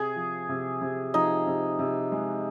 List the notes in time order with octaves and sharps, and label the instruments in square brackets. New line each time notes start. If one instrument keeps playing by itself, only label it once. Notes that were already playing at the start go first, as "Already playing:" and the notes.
Already playing: [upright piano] C3 [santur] G#4
[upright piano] F3
C3
C3
[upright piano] F3 [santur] D#4
[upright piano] C3
C3
G#3